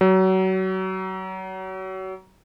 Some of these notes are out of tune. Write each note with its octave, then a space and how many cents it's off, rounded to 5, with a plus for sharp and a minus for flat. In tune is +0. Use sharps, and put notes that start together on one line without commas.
F#3 +30